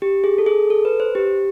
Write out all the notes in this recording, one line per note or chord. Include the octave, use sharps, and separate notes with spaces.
G4
G#4
A4
G#4
A4
B4
C5
G4